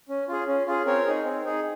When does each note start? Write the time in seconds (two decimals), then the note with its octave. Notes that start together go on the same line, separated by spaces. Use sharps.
0.09 C#4
0.28 F4 G#4
0.48 C#4
0.67 F4 G#4
0.86 C4 A#4 C#5
1.06 D#4 G#4
1.25 C4
1.45 D#4 G#4